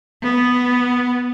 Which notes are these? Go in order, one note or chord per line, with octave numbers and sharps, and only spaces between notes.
B3